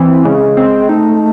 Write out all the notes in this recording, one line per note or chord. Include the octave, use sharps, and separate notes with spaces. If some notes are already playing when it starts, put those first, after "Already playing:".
Already playing: E3 C4
C#3 G#3
C4
A3 D#4